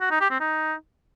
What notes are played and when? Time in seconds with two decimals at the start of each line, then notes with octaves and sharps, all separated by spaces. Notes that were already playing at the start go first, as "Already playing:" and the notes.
0.01 F#4
0.11 D#4
0.20 G4
0.30 C4
0.40 D#4